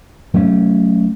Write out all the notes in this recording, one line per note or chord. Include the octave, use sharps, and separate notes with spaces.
F#3 A3 C#4